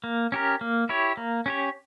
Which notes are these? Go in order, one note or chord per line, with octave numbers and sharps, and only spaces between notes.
A#3
C#4 G4 A#4
A#3
E4 G4 C#5
A#3
C#4 G4 C#5